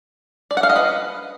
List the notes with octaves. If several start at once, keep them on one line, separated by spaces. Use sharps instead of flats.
D5
F#5
F5
D#5
B4